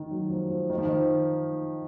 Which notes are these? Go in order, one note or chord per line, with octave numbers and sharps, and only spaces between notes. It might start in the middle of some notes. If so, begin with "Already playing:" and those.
Already playing: D#3
F#3
F3
F3
D#3
F3
D#3